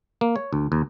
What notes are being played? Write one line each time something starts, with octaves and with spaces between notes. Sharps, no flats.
A#3
C#5
D2
D#2